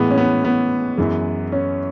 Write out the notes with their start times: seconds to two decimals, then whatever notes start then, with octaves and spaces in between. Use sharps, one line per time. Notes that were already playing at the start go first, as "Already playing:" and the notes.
Already playing: A2 E3 G#3 B3
0.11 C#4
0.18 B3
0.45 B3
0.97 F#2 E3 G#3
1.52 C#4